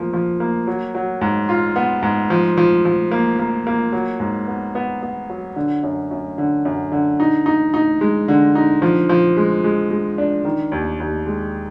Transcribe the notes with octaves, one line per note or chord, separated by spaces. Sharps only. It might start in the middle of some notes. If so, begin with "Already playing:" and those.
Already playing: F3 A#3
F3
A#3
F#3
F#3
G#2
F4
B3
G#2
F3
F3
F3
A#3
A#3
A#3
F#3
G#2
B3
B3
B3
F#3
D3
F#2
F#2
D3
F#2
D3
D#4
D#4
D#4
G#3
D3
D#4
F3
F3
G#3
G#3
G#3
D4
D#3
D#2
D#2
G#3